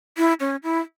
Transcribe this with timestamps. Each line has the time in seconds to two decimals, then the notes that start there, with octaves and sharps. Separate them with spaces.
0.17 E4
0.40 C#4
0.63 E4